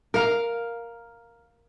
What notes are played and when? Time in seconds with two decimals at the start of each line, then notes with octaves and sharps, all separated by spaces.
0.14 A#4 F5